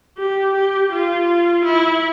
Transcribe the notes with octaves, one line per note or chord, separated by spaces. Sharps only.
G4
G4
F4
E4